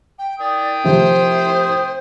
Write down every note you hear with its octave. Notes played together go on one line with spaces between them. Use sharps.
G5
D5 G5 D#6
C3 F3 A3 C5